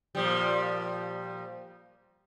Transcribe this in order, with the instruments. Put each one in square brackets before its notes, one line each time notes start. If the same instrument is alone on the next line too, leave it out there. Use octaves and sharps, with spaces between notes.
[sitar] A#2 F3 G3